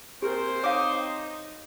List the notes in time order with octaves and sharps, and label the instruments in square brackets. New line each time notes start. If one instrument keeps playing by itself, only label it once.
[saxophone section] A#2 A#4 [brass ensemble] C4 C5 [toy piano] G4
[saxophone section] D#4 [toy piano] C#5 F5 [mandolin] D6 D#6